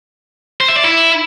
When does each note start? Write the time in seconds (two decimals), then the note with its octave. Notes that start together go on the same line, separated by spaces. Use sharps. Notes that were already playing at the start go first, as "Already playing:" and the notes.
0.60 C5
0.68 E5
0.76 D5
0.84 E4